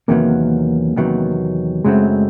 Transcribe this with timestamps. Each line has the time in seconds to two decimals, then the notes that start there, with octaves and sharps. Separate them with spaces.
0.08 E2 C3 D#3 F#3 A#3 B3
0.96 E2 C3 D#3 F#3 B3
1.85 F#2 C#3 F#3 G#3 A3 C4